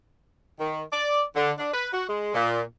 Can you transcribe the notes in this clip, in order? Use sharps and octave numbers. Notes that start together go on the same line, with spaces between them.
D#3
D5
D3
D4
B4
F#4
G#3
A#2